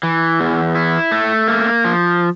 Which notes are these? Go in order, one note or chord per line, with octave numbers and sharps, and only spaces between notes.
E3
E2
E4
A3
A#3
F3